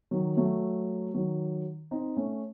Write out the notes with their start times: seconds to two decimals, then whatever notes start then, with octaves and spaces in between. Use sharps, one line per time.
0.11 D#3 F#3
0.37 F#3 A3
1.14 D#3 F#3
1.91 C4 D#4
2.17 A3 C#4